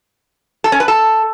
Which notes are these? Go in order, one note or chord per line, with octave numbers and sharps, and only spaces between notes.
A4
C#4
B4
A4